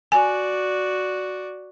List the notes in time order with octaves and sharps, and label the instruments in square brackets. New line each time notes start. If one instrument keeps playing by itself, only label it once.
[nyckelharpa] F#4 D5 [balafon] G#5